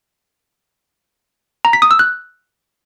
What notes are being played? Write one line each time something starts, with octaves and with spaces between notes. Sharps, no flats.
A#5
B6
D#6
E6
F#6